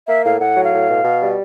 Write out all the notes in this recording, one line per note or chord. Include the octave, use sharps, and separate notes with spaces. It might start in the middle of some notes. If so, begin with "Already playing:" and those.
A#3 E5
A2 F5
A2 F#5
F#3
F5
A2
B2
B2
G3